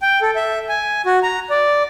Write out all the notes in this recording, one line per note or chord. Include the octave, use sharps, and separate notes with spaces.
G5
A4
E5
G#5
F#4
A#5
D5